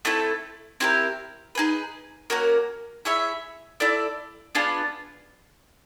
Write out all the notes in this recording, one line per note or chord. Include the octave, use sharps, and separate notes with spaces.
A3 C4 E4 A4
C4 E4 G4 A#4
D#4 G#4 B4
A#3 C#4 F#4 A#4
E4 G#4 C#5 E5
E4 A4 D5
B3 D4 F4 G#4